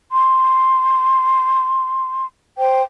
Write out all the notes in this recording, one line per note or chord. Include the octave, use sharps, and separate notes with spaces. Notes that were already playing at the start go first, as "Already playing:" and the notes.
C6
C5 G5